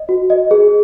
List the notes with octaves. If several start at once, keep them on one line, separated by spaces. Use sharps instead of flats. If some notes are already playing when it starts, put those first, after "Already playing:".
Already playing: D#5
F#4
D#5
G#4